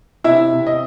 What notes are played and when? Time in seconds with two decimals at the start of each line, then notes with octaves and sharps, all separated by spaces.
0.24 C3 E4 E5
0.53 C3
0.67 D#5